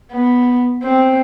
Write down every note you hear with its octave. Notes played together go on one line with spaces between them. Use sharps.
B3
C4